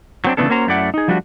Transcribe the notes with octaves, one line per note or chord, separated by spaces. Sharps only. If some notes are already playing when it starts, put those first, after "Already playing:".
F#3 C4 D4
C#3 E3 A3 B3 D4 A4
A#3 C#4 F#4 C5 A#5
F#2 A3 E4 D5 F#5
D#4 G#4
F3 G3 A3 D4 F#4